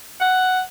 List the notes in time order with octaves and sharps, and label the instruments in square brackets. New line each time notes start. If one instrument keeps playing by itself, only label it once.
[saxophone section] F#5